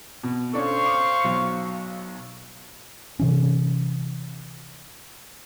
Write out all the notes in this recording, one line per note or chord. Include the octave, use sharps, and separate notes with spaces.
B2
C#4 D4 A4 C5 F5 C#6
D6
B1 F#3
C3 E3 C#4